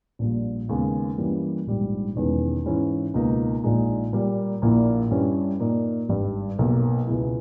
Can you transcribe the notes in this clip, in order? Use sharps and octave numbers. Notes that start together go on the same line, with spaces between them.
A#1 A#2 G3
D#2 C#3 G#3 B3
G2 E3 G3 A#3 C#4
A#1 G#2 G3
E1 E2 D#3 G#3 C#4
G#2 E3 G#3 C#4 E4
C#2 B2 A#3 D#4
A#1 A#2 G#3 D#4
A#2 G3 A#3
A#1 A#2 A#3 E4
G2 G3 C#4 E4
A#2 A#3 D#4
G#1 G2 G3
B1 B2 A#3
C#2 B2 G#3 B3 E4